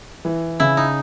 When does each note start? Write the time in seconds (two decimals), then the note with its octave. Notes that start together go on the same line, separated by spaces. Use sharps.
0.25 E3
0.60 C#3 E4
0.77 D#4